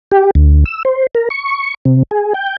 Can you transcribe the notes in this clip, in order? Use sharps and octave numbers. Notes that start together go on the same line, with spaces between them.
G4
D2
E6
C5
A#4
C#6
C3
G#4
G5